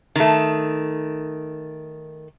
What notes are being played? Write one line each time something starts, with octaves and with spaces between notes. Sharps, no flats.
D#3 A3